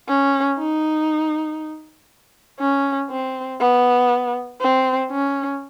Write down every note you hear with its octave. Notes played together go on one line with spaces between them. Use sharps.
C#4
D#4
C#4
C4
B3
C4
C#4